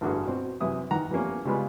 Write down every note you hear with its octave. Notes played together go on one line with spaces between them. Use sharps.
A1 G2 D3 F#4 G#4
B2 C4 F#4
F#2 C3 E3 E4 D#6
D#3 E3 F#5 A#5
E3 F3 G3 A3 A#3 C#4
C#3 G3 G#3 B3 F4 B4